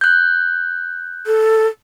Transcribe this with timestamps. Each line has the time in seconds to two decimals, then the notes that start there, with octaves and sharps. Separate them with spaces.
0.01 F#6 G6
1.27 A4